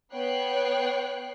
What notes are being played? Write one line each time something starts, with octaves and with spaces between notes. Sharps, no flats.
B3 C#5 G5 F#6 C7